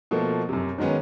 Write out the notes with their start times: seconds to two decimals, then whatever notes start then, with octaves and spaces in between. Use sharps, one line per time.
0.11 B2 F3 A3 A#3
0.49 F#2 C3
0.78 D#3 F#3 G#3 B3 C#4